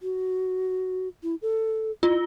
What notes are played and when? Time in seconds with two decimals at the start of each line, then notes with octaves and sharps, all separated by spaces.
0.01 F#4
1.23 E4
1.42 A4
2.03 E4 F4